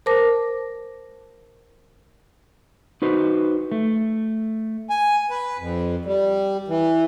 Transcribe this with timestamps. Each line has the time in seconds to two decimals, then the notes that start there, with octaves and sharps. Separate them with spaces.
0.06 A#4 C5 A5 D6 A#6
3.02 D#4 F#4 B4 C5
3.72 A3
4.90 G#5
5.30 B4
5.58 F2
6.05 G3
6.68 E3